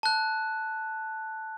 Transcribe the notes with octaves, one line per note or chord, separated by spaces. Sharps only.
A5 F#6